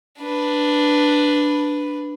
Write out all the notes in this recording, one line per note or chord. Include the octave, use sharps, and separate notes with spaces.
D4 B4